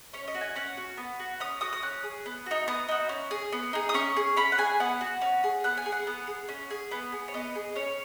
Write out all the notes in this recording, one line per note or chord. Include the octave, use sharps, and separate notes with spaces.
C#4 C#5
D#5
F#4
G#5
C#4 F#5
F#4
B3
F#4
C#4 D#6
F#4 D#6
D#6
C#4 F#6
G#4
B3
D#4 F#4
B3 D#6
D#4 F#4
C#4
G#4
B3
D#4 G#4
D#6
C#4 C#6
G#4
C#4 B5
F#5
G#4 G#5
B3 F#5
F#4
C#4
G#4
B3 F#5
G#5
G#4
F#5
B3
G#4
C#4
G#4
B3
G#4
C#5
B3 D#5
G#4
C#4 C#5